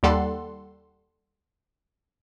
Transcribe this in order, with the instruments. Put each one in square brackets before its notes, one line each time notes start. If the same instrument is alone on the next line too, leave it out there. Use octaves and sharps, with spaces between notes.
[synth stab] D#2 G3 A4 F#5 C6